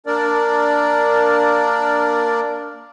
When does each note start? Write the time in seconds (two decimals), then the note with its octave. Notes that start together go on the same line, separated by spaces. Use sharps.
0.06 A#3 D4 A#4 D5